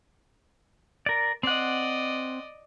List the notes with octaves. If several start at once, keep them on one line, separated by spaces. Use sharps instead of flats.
A#4 D5
C4 D5 D#5 F#5